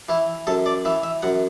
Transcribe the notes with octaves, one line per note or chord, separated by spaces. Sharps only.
E3 E4
F#2 A4
D5
E3 E5
E5
F#2 F#5